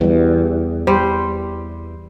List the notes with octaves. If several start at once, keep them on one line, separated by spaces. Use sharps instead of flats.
E2 E3 G3
G3 C5